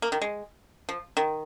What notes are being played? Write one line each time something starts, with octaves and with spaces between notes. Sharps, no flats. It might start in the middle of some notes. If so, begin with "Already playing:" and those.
A#3
D#3
G#3
F3
D#3